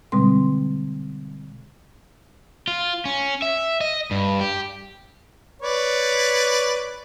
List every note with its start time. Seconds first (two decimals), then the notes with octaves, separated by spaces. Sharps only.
0.12 B2 D3 G3 G#3 C4 C6
2.67 F4
3.05 C#4
3.42 E5
3.81 D#5
4.11 G2
4.41 G4
5.62 B4 C#5 D5